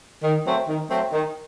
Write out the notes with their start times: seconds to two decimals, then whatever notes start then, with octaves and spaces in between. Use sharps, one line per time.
0.24 D#3
0.45 F#3 A3 C4
0.69 D#3
0.90 F#3 A3 C4
1.12 D#3